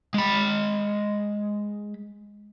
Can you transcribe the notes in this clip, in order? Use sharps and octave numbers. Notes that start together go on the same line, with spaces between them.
G#3 B5